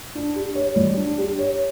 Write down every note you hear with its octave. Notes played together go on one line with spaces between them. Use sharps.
D4
G4
C#5
G3
D4
G4
C#5